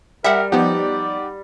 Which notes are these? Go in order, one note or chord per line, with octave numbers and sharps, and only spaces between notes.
G3 A#4 E5 F#5
F3 B3 D#4 G4 D5 F#5